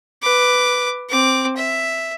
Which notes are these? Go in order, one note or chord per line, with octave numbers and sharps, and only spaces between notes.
B4 D6
C4 D6
E5